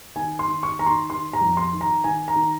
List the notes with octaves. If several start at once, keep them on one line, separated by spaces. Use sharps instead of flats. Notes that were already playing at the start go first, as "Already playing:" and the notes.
D#3 G#5
C6
D#3
C#6
D#3 A#5
C6
D#3 C6
A#5
F2
C6
D#3
A#5
D#3 G#5
A#5
D#3